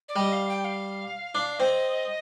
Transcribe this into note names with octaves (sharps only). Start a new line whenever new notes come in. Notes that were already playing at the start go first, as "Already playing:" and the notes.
D5
G3 D#5
F5
G5
F5
D4
C4 D#5